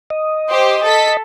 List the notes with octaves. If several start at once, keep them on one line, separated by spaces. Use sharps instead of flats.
D#5
G4 C5
A4 B6